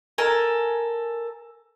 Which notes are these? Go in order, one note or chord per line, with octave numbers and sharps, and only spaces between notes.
A4 A#4 G#5